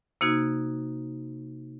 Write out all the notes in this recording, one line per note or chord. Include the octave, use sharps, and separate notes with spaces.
C3 A#3 D#4 F#4 G#6